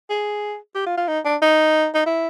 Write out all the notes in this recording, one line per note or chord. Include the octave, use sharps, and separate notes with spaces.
G#4
G4
F4
F4
D#4
D4
D#4
D#4
E4